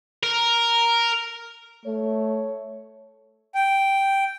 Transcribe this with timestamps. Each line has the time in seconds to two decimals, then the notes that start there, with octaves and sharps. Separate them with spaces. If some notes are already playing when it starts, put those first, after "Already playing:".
0.23 A#4
1.86 A3 C#5
3.55 G5